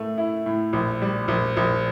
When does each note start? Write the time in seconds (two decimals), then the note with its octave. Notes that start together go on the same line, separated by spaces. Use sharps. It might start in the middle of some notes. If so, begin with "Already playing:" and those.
Already playing: A2 A3
0.18 E4
0.46 A2
0.73 A#1
1.02 G3
1.28 A#1
1.57 A#1